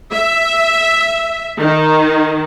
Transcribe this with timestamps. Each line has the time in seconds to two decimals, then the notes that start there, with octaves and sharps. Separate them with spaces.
0.12 E5
1.58 D#3